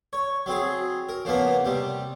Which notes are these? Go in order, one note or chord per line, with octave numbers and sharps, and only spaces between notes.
C#5
F#3 C4 G#4
A#4
C#3 F3 A#3 B3
C3 G3